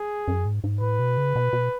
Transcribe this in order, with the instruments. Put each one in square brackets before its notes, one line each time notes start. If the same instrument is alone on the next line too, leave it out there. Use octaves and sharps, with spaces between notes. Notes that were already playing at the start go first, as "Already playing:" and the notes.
Already playing: [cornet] G#4
[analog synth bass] F#2
G#2
G#2
[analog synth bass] A2 [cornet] B4
[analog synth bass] B2
C#3
B2
B2